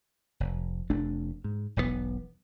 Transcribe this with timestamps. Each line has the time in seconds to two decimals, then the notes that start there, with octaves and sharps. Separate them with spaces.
0.40 F1
0.90 F1 C3 A3 D4
1.44 G#2
1.77 E1 B1 C#3 B3